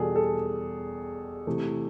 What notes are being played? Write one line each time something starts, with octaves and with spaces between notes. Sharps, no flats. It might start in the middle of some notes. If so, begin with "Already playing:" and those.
Already playing: E2 B2 G3 G#4 A4
A4
C3 E3 A3